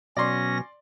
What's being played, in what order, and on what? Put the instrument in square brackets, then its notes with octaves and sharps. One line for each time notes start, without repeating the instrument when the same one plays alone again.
[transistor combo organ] B2 F#3 [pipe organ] C#4 A#6 [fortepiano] D5 C6